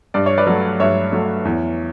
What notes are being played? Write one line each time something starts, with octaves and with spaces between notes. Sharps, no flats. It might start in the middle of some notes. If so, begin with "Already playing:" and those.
G2 D5
C#5
B4 D5
F#3 A3
G2 C#5 E5
F#3 A3
E2